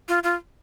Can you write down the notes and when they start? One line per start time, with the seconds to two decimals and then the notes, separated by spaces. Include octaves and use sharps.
0.08 F4
0.23 F4